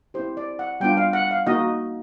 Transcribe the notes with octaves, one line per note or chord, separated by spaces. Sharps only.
C4 E4 G4 C5
D5
F#5
G3 B3 D4 F4 G5
F5
F#5
F5
A#3 D#4 F#4 D#5